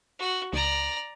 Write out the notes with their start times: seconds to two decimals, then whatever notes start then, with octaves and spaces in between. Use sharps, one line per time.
0.19 F#4
0.53 C#2 D5 A#5